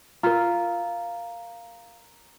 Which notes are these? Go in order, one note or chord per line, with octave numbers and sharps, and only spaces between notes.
F4 A#4 A#5